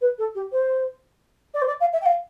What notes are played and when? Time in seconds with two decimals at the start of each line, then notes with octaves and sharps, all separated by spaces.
0.01 B4
0.18 A4
0.35 G4
0.52 C5
1.54 D5
1.62 C5
1.67 D5
1.80 F5
1.93 E5
2.01 G5
2.05 F5